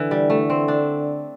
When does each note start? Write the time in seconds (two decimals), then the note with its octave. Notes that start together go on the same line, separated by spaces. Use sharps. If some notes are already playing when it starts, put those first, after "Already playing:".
Already playing: D3 E3
0.11 G3
0.30 A3
0.50 C4
0.68 D4